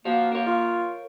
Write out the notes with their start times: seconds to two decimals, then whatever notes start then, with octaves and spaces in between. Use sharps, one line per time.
0.05 A#3 F#4 C5 F5
0.32 A#4 C#5
0.47 F4